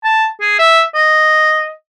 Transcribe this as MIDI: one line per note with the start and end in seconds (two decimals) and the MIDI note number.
0.04 0.26 81
0.41 0.55 68
0.59 0.82 76
0.95 1.71 75